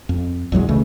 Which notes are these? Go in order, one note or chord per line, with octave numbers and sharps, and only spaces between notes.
F2
A#1 E2 F#3 G#3
C#2 C#3 E3 A3